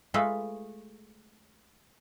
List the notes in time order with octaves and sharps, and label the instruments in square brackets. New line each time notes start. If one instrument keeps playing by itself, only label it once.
[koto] G#3 A3 F4 A4 B4